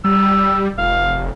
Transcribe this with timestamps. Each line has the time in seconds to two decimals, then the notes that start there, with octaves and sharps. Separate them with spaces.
0.05 G3 E6
0.78 F1 F5